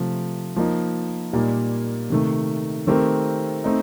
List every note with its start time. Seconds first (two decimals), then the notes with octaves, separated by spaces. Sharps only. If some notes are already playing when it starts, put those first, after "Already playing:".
Already playing: C3 F3 A3
0.56 F3 A#3 D#4
1.33 A#2 G3 A#3 D#4
2.10 C3 D#3 A3
2.87 D#3 A3 C4 G4 A#4
3.64 A3 C4 D#4